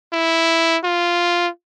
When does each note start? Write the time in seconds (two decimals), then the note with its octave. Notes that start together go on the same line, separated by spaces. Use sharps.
0.13 E4
0.84 F4